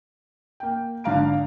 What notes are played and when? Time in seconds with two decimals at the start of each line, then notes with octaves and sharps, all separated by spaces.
0.60 A#3 G5
1.04 G#1 D3 D4 F5 A#5 D7